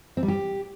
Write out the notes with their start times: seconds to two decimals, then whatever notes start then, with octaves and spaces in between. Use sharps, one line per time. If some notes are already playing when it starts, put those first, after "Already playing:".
0.17 C4
0.23 G3
0.28 G4